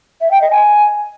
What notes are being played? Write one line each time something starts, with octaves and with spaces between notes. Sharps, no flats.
E5
G5
D#5
G#5